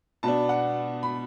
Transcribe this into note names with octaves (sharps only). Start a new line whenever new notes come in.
B2 B3 D4 A5
F#5
B5